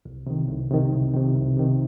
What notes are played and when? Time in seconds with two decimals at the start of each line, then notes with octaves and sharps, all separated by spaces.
0.05 C2
0.26 C3 D#3
0.49 C2
0.71 C3 D#3
0.92 C2
1.14 C3 D#3
1.36 C2
1.57 C3 D#3